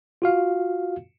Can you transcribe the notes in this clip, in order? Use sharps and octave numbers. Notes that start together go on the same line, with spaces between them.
F4 F#4 F5